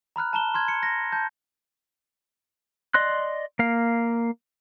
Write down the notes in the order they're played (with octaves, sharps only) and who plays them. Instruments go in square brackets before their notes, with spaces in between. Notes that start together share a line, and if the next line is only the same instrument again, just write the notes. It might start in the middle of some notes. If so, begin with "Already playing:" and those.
[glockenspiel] A#5 B5 F6 F#6
A5 A#5 E7 G7
C6 F6 G#6
C#7
A#6
A5 G6
[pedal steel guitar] D5 D#5 C6 F#6
A#3 F5